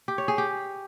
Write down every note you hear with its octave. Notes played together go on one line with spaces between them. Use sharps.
G4
C#5
G#4
G4